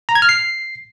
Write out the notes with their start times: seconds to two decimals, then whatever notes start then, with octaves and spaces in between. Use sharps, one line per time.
0.09 A#5
0.15 G#6
0.22 F6
0.29 C7